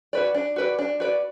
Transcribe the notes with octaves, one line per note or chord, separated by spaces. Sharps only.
F#4 B4 D5
D4
F#4 B4 D5
D4
F#4 B4 D5